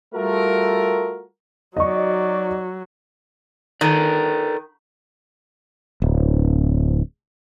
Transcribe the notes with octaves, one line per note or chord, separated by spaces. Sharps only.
G3 A3 F4 F#4 A4 A#4
F#3 D#4 F#4 D5 D#5 C#6
D#3 A4 B4 D5
D1